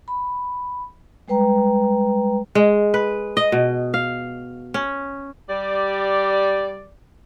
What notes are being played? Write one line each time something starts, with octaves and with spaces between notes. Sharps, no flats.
B5
G3 G#3 B4 G5 A#5
G#3
B4
D#5
B2
F5
C#4
G3 D5